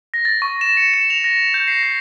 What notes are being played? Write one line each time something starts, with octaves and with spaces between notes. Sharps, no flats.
A#6
A6
C#6
E7
C#7
E7
F7
A#6
G6
C7
A#6